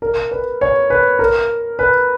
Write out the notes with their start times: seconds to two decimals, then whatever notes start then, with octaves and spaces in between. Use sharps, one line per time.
0.02 A#4
0.31 B4
0.61 C#5
0.90 B4
1.19 A#4
1.79 B4